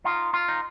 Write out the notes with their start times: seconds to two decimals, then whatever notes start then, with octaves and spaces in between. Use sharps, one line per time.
0.04 D#4 F4
0.34 F4
0.48 D#4